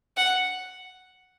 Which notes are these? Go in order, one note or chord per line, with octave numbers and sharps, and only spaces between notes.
F#5